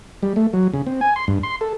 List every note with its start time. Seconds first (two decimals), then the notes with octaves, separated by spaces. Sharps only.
0.23 G3
0.36 A3
0.53 F#3
0.74 C#3
0.87 C4
1.01 G#5
1.16 C6
1.28 G2
1.43 C6
1.61 A4